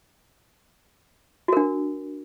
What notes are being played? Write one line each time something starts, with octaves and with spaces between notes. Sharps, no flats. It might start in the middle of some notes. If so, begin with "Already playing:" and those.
D4 F#4 A#4